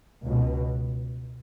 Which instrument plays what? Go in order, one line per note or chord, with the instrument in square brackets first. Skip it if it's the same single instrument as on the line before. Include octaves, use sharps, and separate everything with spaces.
[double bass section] C#2 B2